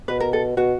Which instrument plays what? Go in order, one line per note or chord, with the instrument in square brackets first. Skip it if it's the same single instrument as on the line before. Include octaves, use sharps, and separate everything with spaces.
[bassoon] B2 [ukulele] B4
[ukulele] A#4
A4
[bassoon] B2 [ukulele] F#4